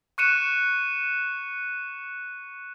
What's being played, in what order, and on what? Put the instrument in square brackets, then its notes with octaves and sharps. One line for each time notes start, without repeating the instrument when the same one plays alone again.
[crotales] C#6 F#6 C#7 D#7 E7